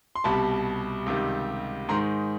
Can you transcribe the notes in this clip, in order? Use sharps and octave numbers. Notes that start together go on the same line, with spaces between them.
C6
C2 B2 G3 A5 B5
C#2 C3 D#3 G3
G#2 D#3 G#3 A#5 C6